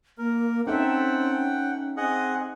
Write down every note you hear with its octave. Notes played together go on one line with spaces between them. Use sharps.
A#3 A#4
C4 C#4 D#4 A4 E5 F#5 G5
C4 G#4 D#5 F#5